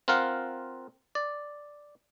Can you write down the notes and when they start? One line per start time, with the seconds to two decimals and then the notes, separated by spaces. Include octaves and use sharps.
0.08 C4 F4 A#4 F5 F#5
1.15 D5